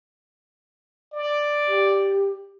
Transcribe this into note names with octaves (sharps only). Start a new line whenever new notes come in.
D5
G4